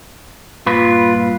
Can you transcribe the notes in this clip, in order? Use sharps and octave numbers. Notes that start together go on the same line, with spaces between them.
G2 A#2 F4 B4